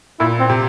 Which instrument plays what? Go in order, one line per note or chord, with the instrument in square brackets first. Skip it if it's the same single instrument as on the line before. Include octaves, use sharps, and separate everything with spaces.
[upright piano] A#2 [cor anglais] E4
[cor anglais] C4
[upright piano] C3